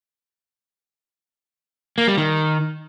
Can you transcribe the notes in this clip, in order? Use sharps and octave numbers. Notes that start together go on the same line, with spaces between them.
A#3
G3
D#3